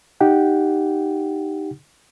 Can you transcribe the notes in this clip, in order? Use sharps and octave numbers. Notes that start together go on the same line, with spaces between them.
D#4 G4 F#5 G5